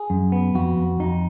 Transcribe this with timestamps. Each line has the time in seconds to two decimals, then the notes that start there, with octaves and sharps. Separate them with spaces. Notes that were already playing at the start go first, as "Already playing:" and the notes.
Already playing: G#4
0.10 F#2
0.32 B3
0.55 F2 F#4
0.77 F2
1.00 F2 D#4